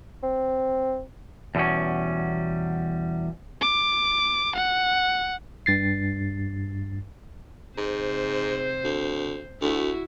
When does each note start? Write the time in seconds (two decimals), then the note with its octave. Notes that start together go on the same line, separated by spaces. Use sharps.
0.23 C4
1.55 E2 B2 G3 C#4
3.61 D6
4.56 F#5
5.66 G2 A6 C7
7.78 G#2 C3 C5
8.84 D2
9.62 D2 E4 F#4